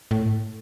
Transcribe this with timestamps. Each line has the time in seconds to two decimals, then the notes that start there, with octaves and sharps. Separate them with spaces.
0.11 A2